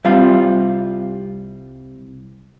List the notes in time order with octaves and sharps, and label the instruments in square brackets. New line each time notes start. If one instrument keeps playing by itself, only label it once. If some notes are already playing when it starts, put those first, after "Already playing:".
[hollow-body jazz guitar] C2 C3 G3 F4 F5